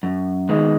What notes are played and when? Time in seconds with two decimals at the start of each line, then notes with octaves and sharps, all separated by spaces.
0.03 F#2
0.49 D#3 G#3 B3 D#4